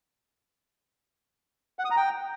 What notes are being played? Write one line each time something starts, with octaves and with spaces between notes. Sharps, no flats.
F#5
D#6
A#5
G5